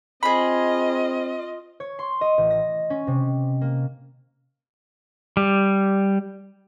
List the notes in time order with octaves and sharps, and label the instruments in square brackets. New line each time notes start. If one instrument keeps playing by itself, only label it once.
[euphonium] C4 [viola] F4 D#5 [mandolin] G#4 B5
[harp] C#5
C6
D#5
A1
A#6
C#4
C3
A#3
[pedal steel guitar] G3